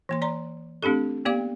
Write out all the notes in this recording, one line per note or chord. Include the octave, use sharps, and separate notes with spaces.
E3 A#3 C6
D5 A#5 C6
A3 C4 D4 G4 A4
A#3 B3 G4 D5 F5 D6